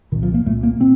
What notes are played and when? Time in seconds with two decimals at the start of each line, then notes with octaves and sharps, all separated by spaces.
0.12 C2 A#2 D#3
0.23 F3
0.34 A#3
0.46 C2 A#2 A3
0.63 A#3
0.80 A#2 C4